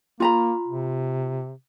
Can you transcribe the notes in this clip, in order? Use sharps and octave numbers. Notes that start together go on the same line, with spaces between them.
A#3 F4 A#5 B5
C3